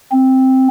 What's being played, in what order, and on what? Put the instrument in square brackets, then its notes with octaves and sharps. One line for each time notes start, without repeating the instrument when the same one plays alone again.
[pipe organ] C4